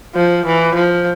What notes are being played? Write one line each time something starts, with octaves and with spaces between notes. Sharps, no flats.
F3
E3
F3